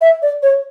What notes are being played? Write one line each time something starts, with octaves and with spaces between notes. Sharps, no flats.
E5
D5
C#5